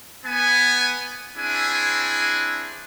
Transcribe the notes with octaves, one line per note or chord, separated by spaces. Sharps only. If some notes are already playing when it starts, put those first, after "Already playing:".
B3 G#5
C4 D4 E4 G#4 G#5